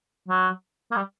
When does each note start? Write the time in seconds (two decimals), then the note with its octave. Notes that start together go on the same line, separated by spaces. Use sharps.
0.29 F#3
0.92 A#3
0.96 G3